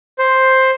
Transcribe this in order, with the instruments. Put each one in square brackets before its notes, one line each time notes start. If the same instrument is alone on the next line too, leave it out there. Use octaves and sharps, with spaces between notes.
[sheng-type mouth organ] C5